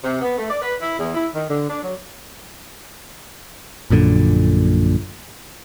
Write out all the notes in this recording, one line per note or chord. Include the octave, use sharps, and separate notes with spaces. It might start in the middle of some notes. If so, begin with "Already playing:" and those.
C3
B3
A3
D5
B4
E4
E2
E4
D#3
D3
D4
F#3
A#1 F#2 A#2 D3